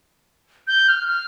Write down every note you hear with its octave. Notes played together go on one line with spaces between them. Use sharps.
G6
F6
F6